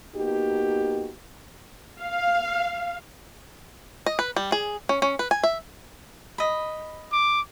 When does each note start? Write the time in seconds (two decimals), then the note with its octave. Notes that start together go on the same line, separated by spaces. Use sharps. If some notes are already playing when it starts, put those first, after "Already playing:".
0.16 A#3 B3 D#4 F#4 G4
2.01 F5
4.06 D#5
4.19 B4
4.36 G3
4.52 G#4
4.89 C#4
5.02 C#4
5.19 B4
5.31 G#5
5.43 E5
6.38 D#5 B5
7.13 D6